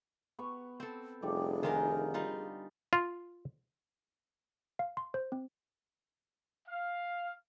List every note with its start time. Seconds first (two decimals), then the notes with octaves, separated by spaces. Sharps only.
0.39 B3 B4 C#6
0.80 C4 A4
1.22 F1 D3 G3 G#4 D5
1.63 D#3 F4 A#4 F#5 G#5
2.14 G3 D#4 F4
2.93 F4
4.79 F5
4.97 C6
5.14 C5
5.32 C4
6.68 F5